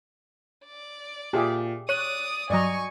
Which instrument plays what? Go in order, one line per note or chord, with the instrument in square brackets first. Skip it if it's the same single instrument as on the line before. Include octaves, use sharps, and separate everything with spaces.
[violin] D5
[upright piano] A#2 [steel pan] G4 G#4 E5
[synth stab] C#5 F#6 [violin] D5 D#6 [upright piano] D#7
[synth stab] G2 F#3 [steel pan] D5 D#5 A#5 [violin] G#5 C#6